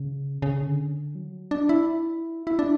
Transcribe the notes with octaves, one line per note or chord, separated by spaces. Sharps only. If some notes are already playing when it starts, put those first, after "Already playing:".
Already playing: C#3
C#3
D3
F#3
D4
E4
E4
D4